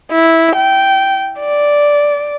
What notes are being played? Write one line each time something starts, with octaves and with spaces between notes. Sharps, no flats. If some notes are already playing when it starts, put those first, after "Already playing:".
E4
G5
D5